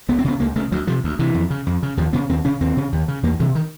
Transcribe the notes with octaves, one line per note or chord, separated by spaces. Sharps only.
C#2 B3
C4
C#3 B3
C#2 A#3
C#3 A3
D2 F#3
C3 F3
D2
C3 E3
F2
C#3
F2
C#3
D#2 F3
C#3 B3
D#2 C4
C#3 C#4
D#2 C4
C#3
D#2
C#3
E2 A#3
C3 E3
D#3